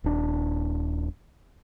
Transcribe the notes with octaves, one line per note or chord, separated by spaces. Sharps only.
D#1 D4